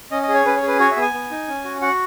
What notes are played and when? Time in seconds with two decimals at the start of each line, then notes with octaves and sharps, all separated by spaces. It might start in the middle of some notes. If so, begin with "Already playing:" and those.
0.11 C#4 D#5
0.22 D#5
0.28 G#4
0.34 C#5
0.45 C#4 B4
0.56 C#5
0.62 G#4
0.68 B4
0.79 F#4 C#5
0.91 E5
0.96 B3
1.02 G#5
1.13 B3
1.31 D#4
1.48 C#4
1.64 F#4
1.81 F#4 F#5